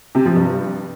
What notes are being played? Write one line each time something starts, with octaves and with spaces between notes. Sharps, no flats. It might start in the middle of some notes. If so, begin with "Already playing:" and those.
C3
F3
G2